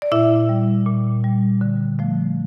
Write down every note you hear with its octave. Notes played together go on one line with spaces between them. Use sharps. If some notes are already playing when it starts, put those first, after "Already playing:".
D5
A#2 E4 E5
G3
A#2
G3
D3
F3 A3